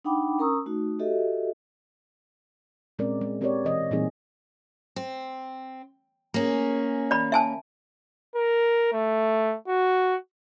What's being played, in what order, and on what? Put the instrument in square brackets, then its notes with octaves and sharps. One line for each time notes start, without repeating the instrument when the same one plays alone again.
[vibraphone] D4 D#4 F#5 G5 B5 D6
C#4 A#4 A#5 C#6 D#6 E6
A3 D#4 F#4
F#4 G4 A4 D#5 E5
[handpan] A#2 G#3 C4 C#4 A#4 D5
G#3
G#3 C4 G4 A#4 C#5 D5
B2 E3 D#5
A#2 E3 G3 C4 D#4 G#4
[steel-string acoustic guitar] C4
A#3 C#4 G#4
[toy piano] D5 B5
E5 G#5 A5
[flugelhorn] A#4
A3
F#4